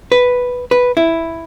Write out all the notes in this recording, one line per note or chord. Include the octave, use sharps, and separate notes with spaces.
B4
B4
E4